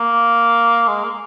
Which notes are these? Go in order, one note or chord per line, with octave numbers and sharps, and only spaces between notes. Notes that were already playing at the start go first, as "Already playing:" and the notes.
Already playing: A#3
G#3
A#3